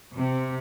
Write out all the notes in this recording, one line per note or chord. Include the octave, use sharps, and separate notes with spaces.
C3